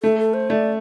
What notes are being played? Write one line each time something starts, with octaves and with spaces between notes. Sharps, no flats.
A3 A4
A4
C5
A3 D5